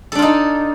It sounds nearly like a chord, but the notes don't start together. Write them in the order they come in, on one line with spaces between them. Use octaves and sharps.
A4 D4 F4 D#4